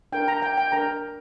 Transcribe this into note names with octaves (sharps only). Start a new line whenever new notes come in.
D4 A#4 G5
A#5
G5
G5
D4 A#4 A#5